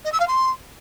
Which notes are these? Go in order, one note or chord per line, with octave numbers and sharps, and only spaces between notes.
D#5
E6
F5
C6